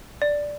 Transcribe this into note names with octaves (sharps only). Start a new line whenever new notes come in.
D5